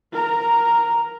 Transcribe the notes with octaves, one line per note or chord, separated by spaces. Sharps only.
A#4 A#5